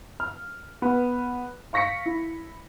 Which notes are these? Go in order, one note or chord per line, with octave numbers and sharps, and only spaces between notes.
F6
B3
F5 C#6 A#6 B6 C#7
E4